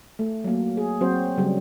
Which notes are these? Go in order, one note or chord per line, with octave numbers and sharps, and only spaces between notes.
A3
F#3 A#3
G#4
F#3 C4 F#4 C5
C#3 F#3 G3